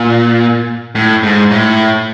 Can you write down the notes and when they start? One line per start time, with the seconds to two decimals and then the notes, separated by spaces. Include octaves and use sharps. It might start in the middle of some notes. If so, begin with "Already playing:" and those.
Already playing: A#2
0.95 A2
1.23 G#2
1.51 A2